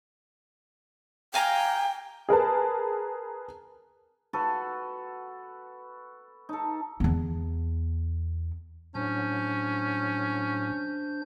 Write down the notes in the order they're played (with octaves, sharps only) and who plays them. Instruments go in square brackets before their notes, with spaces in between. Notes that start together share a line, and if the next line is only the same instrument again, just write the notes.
[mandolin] F5 G#5 A#5 [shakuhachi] G5
[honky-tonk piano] G#4 A#4 B4 A5
[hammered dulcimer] F#4 A4 B4
D#4 A4
[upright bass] E2 B3
[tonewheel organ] A2 F#3 [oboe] C#4 [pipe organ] D4 C5 G6